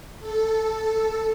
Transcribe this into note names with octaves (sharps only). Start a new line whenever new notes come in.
A4